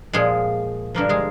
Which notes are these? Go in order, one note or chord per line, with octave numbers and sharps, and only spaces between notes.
A#2 F3 G#3 G#4
G2 D3 F3 A#3 A#4
G#3 G#4